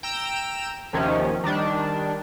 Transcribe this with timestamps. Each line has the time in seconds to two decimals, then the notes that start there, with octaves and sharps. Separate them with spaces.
0.03 G5 A#5 E6 D7 E7
0.93 D#2 C3 D#3 F3 C#4
1.44 D#3 G3 D4